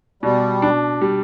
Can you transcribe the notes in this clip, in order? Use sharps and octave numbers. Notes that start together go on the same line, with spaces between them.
B2 G3
D4
G3